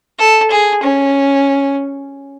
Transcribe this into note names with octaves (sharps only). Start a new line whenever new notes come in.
A4
G#4
C#4